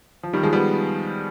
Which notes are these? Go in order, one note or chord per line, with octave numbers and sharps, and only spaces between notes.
F3
D#3 G3
F3 G#3
G3 B3